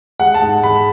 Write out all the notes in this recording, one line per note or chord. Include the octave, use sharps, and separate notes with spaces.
G#3 F#5
A5
G#2
G#3 B5